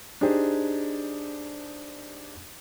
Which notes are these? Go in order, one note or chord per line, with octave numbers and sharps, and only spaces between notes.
D4 D#4 G4 G#4 C5